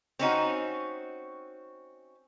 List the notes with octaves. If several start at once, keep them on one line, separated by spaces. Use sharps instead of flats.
C4 C#4 D#4 F#4